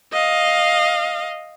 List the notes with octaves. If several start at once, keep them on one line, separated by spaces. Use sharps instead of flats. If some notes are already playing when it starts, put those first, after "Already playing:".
D#5 F5